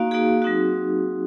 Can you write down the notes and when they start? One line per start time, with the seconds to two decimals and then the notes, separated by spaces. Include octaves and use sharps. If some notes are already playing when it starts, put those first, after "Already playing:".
Already playing: A#3 D#4 F#4 F5
0.11 A#3 D#4 F#4 G#4
0.42 F#3 C4 D#4 F#4